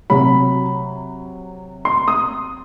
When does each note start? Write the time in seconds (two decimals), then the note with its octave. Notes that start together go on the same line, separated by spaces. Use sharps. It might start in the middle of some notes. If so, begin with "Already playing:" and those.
0.10 C3 F#3 B5
1.85 C6
2.08 D#6